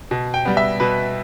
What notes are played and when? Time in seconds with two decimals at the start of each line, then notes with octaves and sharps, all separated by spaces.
0.11 B2
0.34 G5
0.45 G3 B3
0.57 E5
0.80 B2 B4